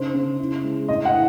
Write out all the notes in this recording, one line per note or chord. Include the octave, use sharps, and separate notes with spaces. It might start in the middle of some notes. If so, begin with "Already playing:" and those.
Already playing: C#3 D#4 C5
C#3
E4
G#3
A2 D#5
F#5
E3